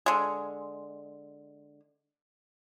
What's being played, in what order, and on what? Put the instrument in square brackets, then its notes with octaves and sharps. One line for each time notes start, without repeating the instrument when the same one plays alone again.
[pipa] D3 G#3